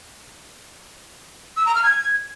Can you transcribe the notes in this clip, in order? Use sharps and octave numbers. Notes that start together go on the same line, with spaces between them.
E6
A#5
F6
G#6